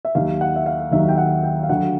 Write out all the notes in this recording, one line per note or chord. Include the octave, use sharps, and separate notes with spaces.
E5
D#2 D#3 F#3 F5
F#5
E5
F5
D#2 D#3 F#3 E5
G5
F#5
G5
F5
D2 D3 F#3 F#5